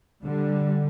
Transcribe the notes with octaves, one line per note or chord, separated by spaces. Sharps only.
D3 G3